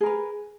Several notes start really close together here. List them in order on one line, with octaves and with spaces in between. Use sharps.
G#4 A#4 B4